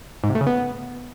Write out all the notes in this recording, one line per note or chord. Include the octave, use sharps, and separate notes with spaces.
G#2
C3
A3
C#3
B3